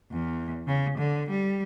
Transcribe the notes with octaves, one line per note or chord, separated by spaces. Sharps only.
E2
C#3
D3
G3